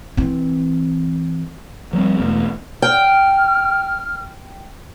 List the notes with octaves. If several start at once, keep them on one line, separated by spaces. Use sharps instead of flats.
E3 C4
F3 G3 A3 C4
E1 E2 A3
G5 F6